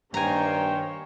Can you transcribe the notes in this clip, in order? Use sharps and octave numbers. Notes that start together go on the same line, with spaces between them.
G2 D#3 A#3 C5 C#5 G5 G#5 A#5